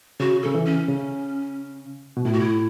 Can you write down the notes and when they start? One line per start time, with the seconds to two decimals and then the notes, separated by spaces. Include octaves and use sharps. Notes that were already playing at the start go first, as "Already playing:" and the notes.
0.20 C#3 F#4
0.42 C#3 A4
0.55 E3
0.65 C#4
0.88 C#3
2.17 B2
2.25 A2 E4
2.33 F#4
2.40 E4